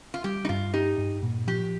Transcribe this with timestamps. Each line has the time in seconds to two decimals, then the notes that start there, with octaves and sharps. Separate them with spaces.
0.14 F4
0.24 G3 G4
0.45 D#4
0.49 G2 F4
0.74 D#4 G4
0.98 G2
1.23 A#2
1.47 F3 G4